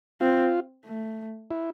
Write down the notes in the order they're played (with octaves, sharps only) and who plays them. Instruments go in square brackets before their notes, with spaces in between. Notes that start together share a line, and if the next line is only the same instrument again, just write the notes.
[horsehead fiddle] C4 [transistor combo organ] F4
[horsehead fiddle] A3
[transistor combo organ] E4